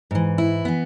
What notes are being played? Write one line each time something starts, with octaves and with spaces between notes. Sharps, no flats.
G#2 E3
E4
E3 B3